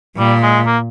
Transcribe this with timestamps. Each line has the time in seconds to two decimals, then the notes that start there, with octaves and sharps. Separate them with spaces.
0.17 A#2 G3
0.42 G#3
0.66 A#3